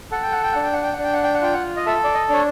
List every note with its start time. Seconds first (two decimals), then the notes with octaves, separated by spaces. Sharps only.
0.12 A4 F#5
0.23 G5
0.32 F#5
0.43 G5
0.52 D4 F#5
0.63 G5
0.73 F#5
0.83 G5
0.93 F#5
0.99 D4 G5
1.13 F#5
1.23 G5
1.34 F#5
1.42 F4 G5
1.53 F#5
1.77 D#5
1.86 A4 E5
2.04 D5
2.14 D#5
2.29 D4 C#5